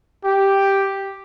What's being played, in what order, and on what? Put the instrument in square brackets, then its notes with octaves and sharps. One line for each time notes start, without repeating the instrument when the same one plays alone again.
[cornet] G4